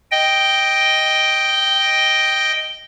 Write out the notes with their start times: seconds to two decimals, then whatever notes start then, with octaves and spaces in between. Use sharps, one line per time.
0.11 D#5 G5